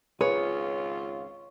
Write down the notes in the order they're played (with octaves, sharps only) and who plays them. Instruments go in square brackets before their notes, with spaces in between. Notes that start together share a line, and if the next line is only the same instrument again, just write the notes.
[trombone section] G#1 C#2 F4 [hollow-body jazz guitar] G#4 B4 [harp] C#5